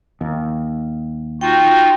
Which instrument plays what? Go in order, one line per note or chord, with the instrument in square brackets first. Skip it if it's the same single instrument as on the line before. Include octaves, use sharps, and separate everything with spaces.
[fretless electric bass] D#2
[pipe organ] D#4 F4 F#4 [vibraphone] G5